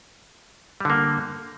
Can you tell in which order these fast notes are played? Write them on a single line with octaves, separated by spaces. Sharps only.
G3 D3 A#3